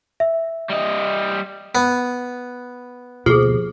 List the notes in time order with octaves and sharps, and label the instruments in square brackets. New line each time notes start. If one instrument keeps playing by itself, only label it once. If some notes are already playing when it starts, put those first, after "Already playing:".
[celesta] E5
[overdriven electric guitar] G3 D#5
[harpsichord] B3
[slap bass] D2 B2 A#3 [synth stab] F3 [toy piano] G4 G#4